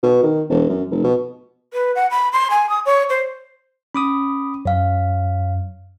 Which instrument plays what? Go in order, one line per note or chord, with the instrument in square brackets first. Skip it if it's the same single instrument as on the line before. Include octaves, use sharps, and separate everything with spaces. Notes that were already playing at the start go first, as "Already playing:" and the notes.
[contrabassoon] B2
D#3
E1
F#2
F1
B2
[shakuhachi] B4
F#5
B5
C6
G#5
D#6
C#5
C5
[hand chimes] C#4 [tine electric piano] B5 D6 D#6
[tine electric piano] F#2 [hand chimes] C#5 F5